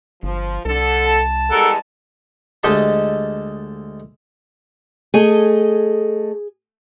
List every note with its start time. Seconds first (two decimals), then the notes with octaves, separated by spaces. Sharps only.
0.23 G1 F3
0.65 C2 D3 A4
1.06 A5
1.51 E2 G3 G#3 A4 A#4 F#5
2.63 D2 G#3 G4 A4 D#5 A5
5.14 A3 G#4 D#5 G#5